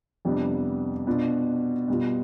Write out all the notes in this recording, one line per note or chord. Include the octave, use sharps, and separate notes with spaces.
F2 C3 G3 B3 D4
B2 B3 D4 F4
B2 G3 B3 F4